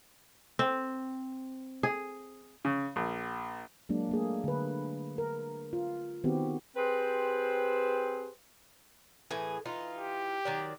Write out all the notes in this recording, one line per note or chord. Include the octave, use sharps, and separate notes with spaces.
C4
G#4
C#3
A#1
F#3 G#3 A#3 D4
A3 A#3 G#4
D3 B4
A#4
F4
D#3 B3 C4 F#4 G4
C4 G4 G#4 B4 C5
A2 E3 G#4
E3 D#4 F4
G4
D#3 F#3 D5